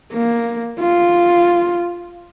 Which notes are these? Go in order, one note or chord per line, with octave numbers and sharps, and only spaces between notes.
A#3
F4